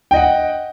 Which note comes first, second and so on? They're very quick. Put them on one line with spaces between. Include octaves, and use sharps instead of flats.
G5 D#5 F#5